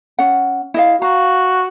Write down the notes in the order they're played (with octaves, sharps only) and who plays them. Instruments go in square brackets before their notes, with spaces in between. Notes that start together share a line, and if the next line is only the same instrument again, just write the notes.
[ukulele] C#4 F#5
E4 D#5 F5
[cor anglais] F#4 [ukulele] F5 A#5